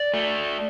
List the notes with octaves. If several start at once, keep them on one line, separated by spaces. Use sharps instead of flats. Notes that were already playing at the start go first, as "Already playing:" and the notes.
Already playing: D5
A3